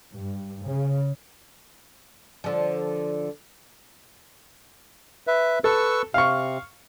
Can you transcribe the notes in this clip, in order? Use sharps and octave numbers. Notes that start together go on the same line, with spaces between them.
G2
C#3
D3 F3
B4 E5
A4 B4 C#6 E6
C3 F5 C#6